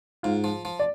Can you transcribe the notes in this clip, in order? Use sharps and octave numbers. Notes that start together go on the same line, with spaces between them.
G#2 F4
F3
F3
D5